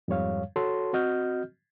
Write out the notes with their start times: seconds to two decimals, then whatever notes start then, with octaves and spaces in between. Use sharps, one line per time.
0.08 F2 G#2 G3 C#5 F5
0.56 F#4 A4 C#5 A5 C6
0.93 C4 F#4 D#5 F6 G6